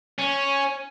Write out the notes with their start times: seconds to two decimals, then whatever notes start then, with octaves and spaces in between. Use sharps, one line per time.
0.19 C#4